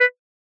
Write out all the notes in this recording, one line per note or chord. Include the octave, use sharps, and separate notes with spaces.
B4